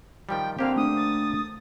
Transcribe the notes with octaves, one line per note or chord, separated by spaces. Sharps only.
D#3 F3 G3 G5
D3 A#3 C4 G4 F5
A3 D4 D#6
A6